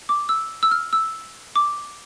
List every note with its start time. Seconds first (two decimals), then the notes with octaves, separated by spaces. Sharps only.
0.09 D6
0.29 E6
0.63 E6
0.71 F6
0.93 E6
1.56 D6